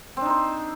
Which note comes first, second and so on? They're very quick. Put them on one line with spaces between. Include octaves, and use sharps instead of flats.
C4 D4 D#4 C5